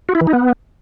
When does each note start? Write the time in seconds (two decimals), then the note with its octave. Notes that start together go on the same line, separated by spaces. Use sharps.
0.09 F#4
0.15 E4
0.21 E3
0.27 D#4
0.33 B3